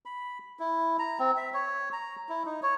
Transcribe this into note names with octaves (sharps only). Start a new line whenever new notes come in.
B5
E4
A#5
C4
E5
C#5
A#5
E4
D#4
C#5